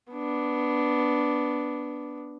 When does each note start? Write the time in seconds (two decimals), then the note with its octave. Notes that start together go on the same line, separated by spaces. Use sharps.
0.13 B3 D4